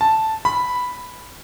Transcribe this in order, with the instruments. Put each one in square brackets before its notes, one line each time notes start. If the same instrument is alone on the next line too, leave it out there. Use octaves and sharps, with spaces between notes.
[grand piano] A5
B5